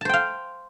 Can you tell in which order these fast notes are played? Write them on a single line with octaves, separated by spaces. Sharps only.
A5 C5 G5 F5